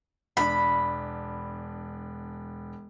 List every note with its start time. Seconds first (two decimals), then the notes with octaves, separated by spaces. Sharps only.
0.37 E1 D4 B5